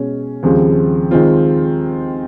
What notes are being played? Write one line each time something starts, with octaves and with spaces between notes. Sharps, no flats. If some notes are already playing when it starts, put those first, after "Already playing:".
Already playing: B2 G#3 C#4
D#2 C#3 F3 G#3 C4
D#3 G#3 C4 F4